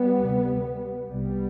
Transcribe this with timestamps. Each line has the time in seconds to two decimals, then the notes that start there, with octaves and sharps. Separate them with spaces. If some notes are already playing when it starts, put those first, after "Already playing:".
Already playing: G3 B3
0.19 D2 C3
1.09 C2 C3 G3 B3